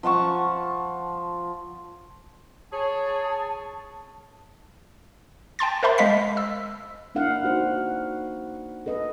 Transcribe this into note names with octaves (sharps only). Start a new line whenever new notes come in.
F3 F#5 A5 C#6
G#4 C#5 A5
G5 A5 C6 A6
A#4 C5 E5 A5 B5 C6
G#3 D#5 F5 B6
E6
A#3 D4 E4 F5 F#5
D#4 F#4 C5
A4 B4 D#5